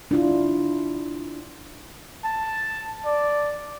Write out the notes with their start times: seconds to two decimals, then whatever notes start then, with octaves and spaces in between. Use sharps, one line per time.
0.11 D4 E4 F4
2.24 A5
3.05 D5